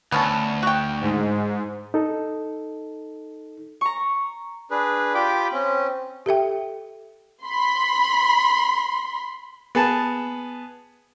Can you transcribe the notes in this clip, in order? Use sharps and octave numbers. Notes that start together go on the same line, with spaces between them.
D2 B3 C#4 A4
F#4 G5
G#2
D#4 A4
A#5 C#6
D4 G#4 B4
F4 G4 G5 B5 D6
C4 C#4
G4 A4 E5 G5
B5 C6
B3 G#4 A5